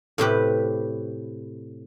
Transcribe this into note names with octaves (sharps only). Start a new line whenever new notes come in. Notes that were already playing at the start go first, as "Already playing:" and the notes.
A2 C3 G4 B4